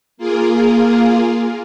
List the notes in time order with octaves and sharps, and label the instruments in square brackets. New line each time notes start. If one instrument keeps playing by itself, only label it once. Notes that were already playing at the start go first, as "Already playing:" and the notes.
[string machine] A#3 F4 G#4 A#4